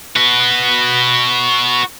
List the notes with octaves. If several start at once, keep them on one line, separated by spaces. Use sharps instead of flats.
F#4 B4